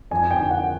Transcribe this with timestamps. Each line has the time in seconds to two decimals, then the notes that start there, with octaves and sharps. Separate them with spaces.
0.11 F2 G#5
0.31 G5
0.40 D3
0.51 F#5